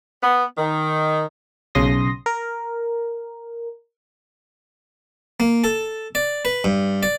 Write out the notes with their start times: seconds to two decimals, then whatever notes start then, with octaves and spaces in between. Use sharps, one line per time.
0.23 B3
0.58 D#3
1.75 B1 C#3 C6 D#6 A#6
2.26 A#4
5.40 A#3
5.64 A4
6.15 D5
6.45 B4
6.64 G2
7.03 D5